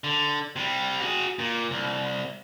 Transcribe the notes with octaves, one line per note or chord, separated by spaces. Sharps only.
D3
C3 G3
F#4 G#4
A#2
C2